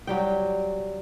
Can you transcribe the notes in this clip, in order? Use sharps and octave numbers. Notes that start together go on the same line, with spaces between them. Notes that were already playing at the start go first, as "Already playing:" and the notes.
F#3 G3 G5